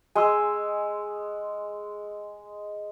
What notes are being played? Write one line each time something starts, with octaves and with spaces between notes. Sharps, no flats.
G#3 G#5 C6 E6